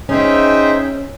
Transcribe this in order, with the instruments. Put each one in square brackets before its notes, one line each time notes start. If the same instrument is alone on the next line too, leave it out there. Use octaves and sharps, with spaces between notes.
[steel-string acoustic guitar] C#4 [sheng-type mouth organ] D#4 G#4 C5 E5 G5